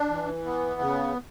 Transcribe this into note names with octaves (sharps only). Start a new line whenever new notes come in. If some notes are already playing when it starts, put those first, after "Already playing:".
Already playing: D4
E3
B3
C#3